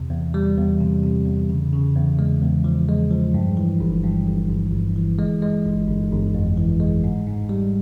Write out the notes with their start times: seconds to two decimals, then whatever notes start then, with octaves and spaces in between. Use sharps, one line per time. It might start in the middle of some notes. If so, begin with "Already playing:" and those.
Already playing: E2 C3
0.11 E2
0.34 G3
0.58 E2
0.80 C3
1.04 C3
1.26 E2
1.50 C#3
1.73 C#3
1.96 E2
2.19 G#3
2.42 E2
2.64 F3
2.88 G#3
3.11 F3
3.34 G2
3.57 E3
3.80 G1
4.04 G2
4.27 G1
4.50 G1
4.73 G1
4.96 E3
5.19 G#3
5.42 G#3
5.65 G1
5.88 G1
6.12 G1
6.34 F2
6.57 E3
6.80 G#3
7.04 G#2
7.27 G#2
7.49 G3